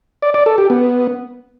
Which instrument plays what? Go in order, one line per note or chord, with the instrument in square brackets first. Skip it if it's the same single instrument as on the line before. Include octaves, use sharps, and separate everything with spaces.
[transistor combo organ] D5
D5
A4
G4
B3